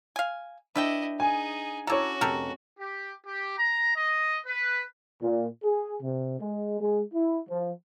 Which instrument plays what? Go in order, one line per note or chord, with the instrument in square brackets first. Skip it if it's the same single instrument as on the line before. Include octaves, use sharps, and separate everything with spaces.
[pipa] F5 G#5
[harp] D4 [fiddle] E4 D#5 [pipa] B4 E5 G5
[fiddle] D#4 G#4 [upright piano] G#5
[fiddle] C#4 F#4 [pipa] E4 A4 [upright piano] C#5 A#5 [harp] D6 F6
[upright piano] F1 [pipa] G4 A4 A#4
[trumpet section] G4
G4
A#5
D#5
B4
[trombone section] A#2
G#4
C3
G#3
G#3
E4
F3